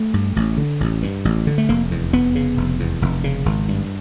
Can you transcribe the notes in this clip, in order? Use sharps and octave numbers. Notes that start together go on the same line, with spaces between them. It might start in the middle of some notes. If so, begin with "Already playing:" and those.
Already playing: A3
G2
A1
D3
A1
G2
A1
D3
A3
F1 A#3
E2
F1 B3
C#3
F1
E2
F1
C#3
G#1
G2